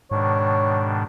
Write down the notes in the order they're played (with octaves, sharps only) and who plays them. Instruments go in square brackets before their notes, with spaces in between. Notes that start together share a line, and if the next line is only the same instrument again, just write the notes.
[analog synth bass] G#2 [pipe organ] B2 D#3 D4 [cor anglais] C#5